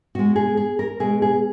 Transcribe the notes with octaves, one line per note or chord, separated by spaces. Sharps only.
B2 G#3 F#4
G#4
G#4
A#4
B2 G#3 G#4
G#4